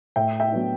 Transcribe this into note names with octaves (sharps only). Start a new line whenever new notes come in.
A2 E5 G5
E5 G5
F#3 B3 D4